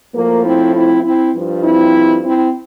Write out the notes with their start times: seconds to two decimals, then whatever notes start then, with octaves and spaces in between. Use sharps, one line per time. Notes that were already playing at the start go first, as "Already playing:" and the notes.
0.14 A2 F3 A#3
0.44 C4 E4
0.74 C4 E4
1.04 C4 E4
1.34 G2 F3
1.64 C4 E4
2.23 C4 E4